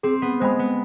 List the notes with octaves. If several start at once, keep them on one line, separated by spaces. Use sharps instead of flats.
C4 G#4
B3
G#3 C5 G5 B5
B3